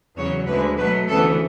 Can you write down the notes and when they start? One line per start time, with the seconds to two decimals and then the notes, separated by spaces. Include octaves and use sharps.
0.17 E2 C#3 F#3 C#5
0.47 D2 D3 G#3 B4
0.78 B2 F#3 A3 B4
1.08 D2 C#3 E3 B3 A4